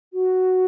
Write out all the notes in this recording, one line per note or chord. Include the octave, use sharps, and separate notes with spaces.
F#4